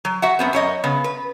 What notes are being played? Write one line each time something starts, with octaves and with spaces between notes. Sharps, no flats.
F#3
F#4 E5 F#5
F#2 B3 C4
F#2 C#5 D#5
C#3 B3
B4